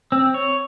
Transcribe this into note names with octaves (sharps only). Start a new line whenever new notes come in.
C4
C#5